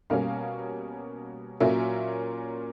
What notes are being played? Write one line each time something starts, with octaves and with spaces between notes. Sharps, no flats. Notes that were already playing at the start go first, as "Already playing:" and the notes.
B2 G3 A#3 C#4 F5
A#2 F#3 A#3 C#4 E5